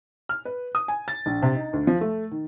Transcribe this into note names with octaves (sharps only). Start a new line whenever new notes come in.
F6
B4
D#6
G#5
A6
A#1
C3
D#4
D2
F3
A3
D#3